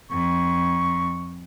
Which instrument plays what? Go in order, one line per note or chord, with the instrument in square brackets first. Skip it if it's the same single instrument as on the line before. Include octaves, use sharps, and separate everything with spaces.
[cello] F2 [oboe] C#6